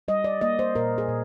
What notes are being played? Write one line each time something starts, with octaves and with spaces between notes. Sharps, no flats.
G3 D#5
D5
A#3 D#5
C5
A#2 A#4
G#4
A#2